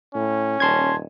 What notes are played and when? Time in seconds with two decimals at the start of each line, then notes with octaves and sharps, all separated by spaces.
0.14 A2 C#4
0.60 D#1 A5 C6 G#6